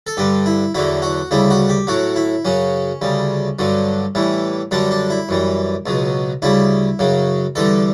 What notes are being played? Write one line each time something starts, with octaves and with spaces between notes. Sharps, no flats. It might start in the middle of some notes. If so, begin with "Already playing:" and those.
A4
G2 D3 G3 G4
E4
E2 D3 F#3 E4
F#4
D2 C#3 G3 E4
F#4
G4
A2 F#3 F#4
E4
F#2 C#3 F#3 C#4
D2 C#3 G3
G2 D3 F#3
A2 E3 G3
F#2 D3 G3 D4
D4
E4
F#2 E3 G3
C#2 B2 F#3
D2 C#3 G3 E4
F#2 C#3 F#3
E2 D3 G3 A4